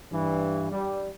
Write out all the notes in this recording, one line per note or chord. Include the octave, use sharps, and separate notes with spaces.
G2 E3
G3